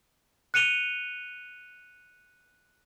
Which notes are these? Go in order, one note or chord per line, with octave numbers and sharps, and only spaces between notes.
F#6 C#7 D#7 F7 G7